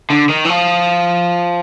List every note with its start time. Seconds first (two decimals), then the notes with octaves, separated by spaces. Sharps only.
0.10 D3
0.29 D#3
0.45 E3
0.49 F3